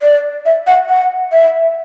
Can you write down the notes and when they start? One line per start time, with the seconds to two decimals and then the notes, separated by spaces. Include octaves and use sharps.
0.02 D5
0.46 E5
0.67 F#5
0.89 F#5
1.33 E5